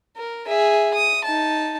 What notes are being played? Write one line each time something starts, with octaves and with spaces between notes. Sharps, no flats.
A#4
G#4 E5
D#6
D#4 A5